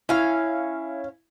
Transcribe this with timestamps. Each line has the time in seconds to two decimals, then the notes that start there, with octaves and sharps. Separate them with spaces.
0.09 C#4 E4 F5